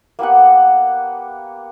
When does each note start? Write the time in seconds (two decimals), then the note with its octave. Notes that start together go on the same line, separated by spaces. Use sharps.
0.19 A#3 B3 G4 F#5